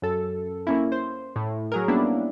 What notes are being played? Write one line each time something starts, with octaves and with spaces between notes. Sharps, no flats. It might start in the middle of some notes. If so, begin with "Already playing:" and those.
F#2 A4
A#3 C#4 E4
C5
A2
F#3 G#4 A#4
G3 A#3 B3 C#4 D4 E4